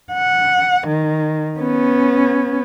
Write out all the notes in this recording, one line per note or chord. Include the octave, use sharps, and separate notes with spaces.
F#5
D#3
B3 C#4